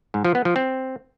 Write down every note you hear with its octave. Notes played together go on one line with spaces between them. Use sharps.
G#2
F3
B3
F3
C4